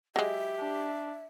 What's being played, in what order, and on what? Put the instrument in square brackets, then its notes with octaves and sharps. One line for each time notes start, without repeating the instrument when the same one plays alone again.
[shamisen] F#3 G#3 [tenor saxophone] G4 [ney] E5
[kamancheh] D4